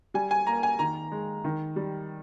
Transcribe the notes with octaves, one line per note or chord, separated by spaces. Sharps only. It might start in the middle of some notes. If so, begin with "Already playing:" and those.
G3 G#5
G#5
A#3 A#5
G#5
D#3 A#5
G#3
D#3
G3